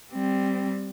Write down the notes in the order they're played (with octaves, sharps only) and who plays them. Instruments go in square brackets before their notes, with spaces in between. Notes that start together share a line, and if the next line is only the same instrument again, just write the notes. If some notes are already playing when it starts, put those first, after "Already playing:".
[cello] G3 C4